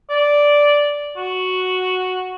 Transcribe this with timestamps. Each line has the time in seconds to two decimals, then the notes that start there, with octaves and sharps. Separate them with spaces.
0.10 D5
1.17 F#4